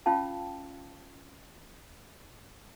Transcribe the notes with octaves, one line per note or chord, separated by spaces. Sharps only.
C#4 F4 F5 G5 A5